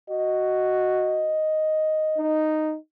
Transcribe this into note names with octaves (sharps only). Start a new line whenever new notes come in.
F#4 D#5
D#4